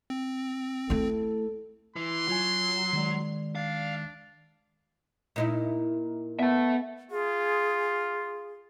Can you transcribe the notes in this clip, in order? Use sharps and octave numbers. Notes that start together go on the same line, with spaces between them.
C4
A3 E4 A4
E3 C6
F#3 F4 G#5
D#3 G#3 D5
D4 F5
A#2 D#4 E4
B3 E5 A5
F4 G#4